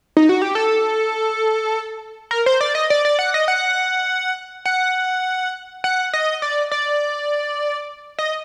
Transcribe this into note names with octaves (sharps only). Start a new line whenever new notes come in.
D#4
F#4
G4
A4
A#4
C5
D5
D#5
D5
D5
F#5
D#5
F#5
F#5
F#5
D#5
D5
D5
D#5